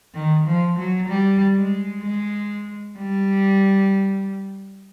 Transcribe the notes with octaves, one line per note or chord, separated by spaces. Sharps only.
D#3
F3
F#3
G3
G#3
G#3
G3